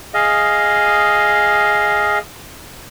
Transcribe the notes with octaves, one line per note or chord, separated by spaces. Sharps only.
G#4 D#5 F5